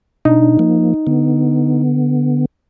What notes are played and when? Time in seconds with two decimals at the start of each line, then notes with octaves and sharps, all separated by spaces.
0.25 B2 D4 D#4
0.59 F3 A#3
1.07 D3 B3